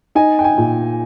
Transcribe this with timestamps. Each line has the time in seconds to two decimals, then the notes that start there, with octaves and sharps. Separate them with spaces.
0.15 D#4 G#5
0.39 G5
0.44 G#5
0.58 A#2